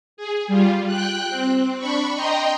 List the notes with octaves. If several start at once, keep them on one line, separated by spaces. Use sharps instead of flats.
G#4
G3 F4
G5 F#6
C4
D4 B5 C#6
D#5 G5 A#5 C6